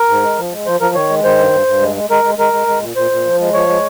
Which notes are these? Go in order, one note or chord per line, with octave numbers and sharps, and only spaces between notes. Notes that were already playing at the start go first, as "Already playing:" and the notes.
Already playing: A#4
G#2
G#3
F3
G#3
F3 C5
F3 A#4
D#3 C#5
G#3
D#3 C5
G2
G2
G2
G#3
G#3
G#3 A#4
G#3
G#3 A#4
G#3
G#3
A#2
A#2 C5
A#2
F3
G#3
F3 C#5
G#3